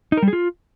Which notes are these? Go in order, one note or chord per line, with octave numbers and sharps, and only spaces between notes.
D#4
A#4
G3
G#4
F4